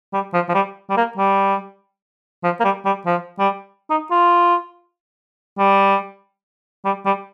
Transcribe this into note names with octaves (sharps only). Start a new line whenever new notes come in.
G3
F3
F3
G3
G3
A#3
G3
F3
A#3
G3
G3
F3
G3
D#4
F4
G3
G3
G3